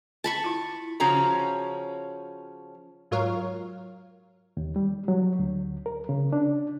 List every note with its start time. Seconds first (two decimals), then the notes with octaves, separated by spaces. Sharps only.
0.24 A5 B5 C#6
0.44 E4 F4
1.00 C#3 F3 C#4 F#4 A#5
3.11 G#2 F#3 F4 A#4 C#5 F5
4.57 D#2
4.76 G3
5.08 F#3
5.39 D2
5.86 A#4
6.09 C#3
6.33 D4